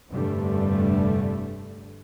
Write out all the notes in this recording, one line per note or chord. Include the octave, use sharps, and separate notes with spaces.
F1 G2 D3 G3 A3